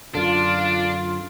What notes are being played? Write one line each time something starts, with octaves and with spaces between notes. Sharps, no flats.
F#2 D3 D4 F4